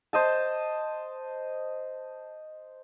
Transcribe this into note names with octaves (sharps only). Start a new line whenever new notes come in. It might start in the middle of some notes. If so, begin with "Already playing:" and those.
C5 D#5 A5